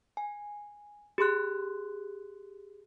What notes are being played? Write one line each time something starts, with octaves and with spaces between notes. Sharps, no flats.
G#5
G4 G#4 C6 F#6